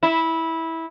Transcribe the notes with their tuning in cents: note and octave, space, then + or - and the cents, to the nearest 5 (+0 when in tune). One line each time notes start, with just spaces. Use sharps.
E4 -15